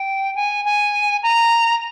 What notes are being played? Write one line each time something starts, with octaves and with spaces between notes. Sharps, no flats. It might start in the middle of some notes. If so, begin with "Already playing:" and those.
Already playing: G5
G#5
G#5
A#5